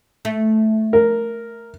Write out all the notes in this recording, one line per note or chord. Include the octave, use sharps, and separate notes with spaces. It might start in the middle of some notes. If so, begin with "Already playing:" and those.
A3
A#4